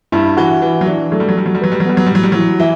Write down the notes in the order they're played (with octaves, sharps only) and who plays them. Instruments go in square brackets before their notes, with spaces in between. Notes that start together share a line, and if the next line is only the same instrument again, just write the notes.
[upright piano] G2 G3 [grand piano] E4
[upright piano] E3 [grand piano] F#4
[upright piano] E3 [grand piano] B4
[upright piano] F#3
[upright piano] E3 [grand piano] D4
[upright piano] F#3 [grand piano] A3
[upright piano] G3
F#3
[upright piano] G3 [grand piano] F#4
[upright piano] F#3
G3
[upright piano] F#3 [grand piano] B4
[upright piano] G3
F#3
[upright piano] G3 [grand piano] B3
[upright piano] F#3
G3
[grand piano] A2 [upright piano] F#3
[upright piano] G3
[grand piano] E3 [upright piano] F#3
[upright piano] E3 E4